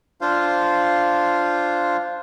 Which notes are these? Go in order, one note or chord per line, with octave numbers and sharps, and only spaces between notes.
D4 F4 C5 F5